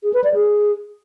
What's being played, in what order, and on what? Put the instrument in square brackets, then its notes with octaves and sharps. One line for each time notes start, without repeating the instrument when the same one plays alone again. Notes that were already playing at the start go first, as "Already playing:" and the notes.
[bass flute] G#4
B4
D5
G#4